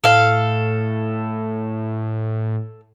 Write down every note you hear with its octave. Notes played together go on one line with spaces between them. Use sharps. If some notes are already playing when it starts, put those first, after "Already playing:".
A2 A4 F5